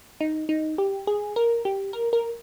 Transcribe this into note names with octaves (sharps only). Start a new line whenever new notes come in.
D#4
D#4
G4
G#4
A#4
G4
A#4
A#4